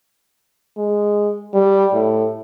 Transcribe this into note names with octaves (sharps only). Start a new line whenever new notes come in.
G#3
G3
A2